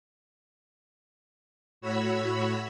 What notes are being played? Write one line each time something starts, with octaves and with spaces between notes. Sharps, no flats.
A2 F#4 C#5 B5 E6